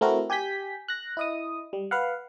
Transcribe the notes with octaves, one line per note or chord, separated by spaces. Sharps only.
A3 C4 E4 F#4 A#4
G4 G#5 G6 B6
F#6 A#6
E4 D#5 D#6
G3
B4 F5 F#5